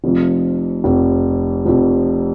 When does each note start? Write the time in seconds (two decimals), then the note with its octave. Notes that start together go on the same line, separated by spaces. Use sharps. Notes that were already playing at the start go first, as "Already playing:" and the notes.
0.04 F1 F2 F3
0.84 F1 F2 F3
1.65 F1 F2 F3